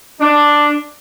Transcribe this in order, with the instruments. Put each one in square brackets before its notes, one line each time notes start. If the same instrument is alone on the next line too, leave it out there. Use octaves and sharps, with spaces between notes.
[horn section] D4